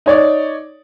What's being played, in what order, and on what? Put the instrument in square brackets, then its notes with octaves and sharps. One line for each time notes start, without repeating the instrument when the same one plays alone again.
[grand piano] D#4 C#5 D5